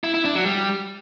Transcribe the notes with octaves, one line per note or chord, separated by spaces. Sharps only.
E4
E4
D4
F#3
G3